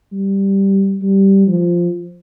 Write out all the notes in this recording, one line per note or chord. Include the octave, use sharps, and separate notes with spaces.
G3
G3
F3